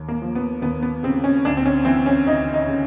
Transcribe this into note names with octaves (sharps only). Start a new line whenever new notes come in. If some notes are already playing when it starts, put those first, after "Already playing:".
Already playing: D#2
A#3
F3
B3
D#2 B3
B3
C#3 C4
C#4
D2 D4
C4
C#4
E3 C4
C#4
D2 D#4
D#4
C#3